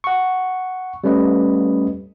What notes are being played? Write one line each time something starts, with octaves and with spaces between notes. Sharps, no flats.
F#5 C#6
G3 A3 C#4 B4 D#5